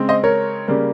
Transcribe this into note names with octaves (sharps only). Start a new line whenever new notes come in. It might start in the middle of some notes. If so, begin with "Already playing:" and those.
Already playing: C#3 G#3 C4
C5 D#5
A#4 C#5
C#3 G3 A#3